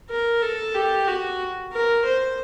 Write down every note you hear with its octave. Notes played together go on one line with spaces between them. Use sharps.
A#4
A4
G4
F#4
A#4
C5